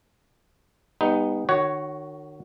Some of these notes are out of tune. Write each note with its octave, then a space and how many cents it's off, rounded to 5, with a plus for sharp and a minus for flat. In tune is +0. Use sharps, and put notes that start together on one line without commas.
G3 +35 B3 +0 D#4 +0
D#3 -40 F#4 +15 C#5 +0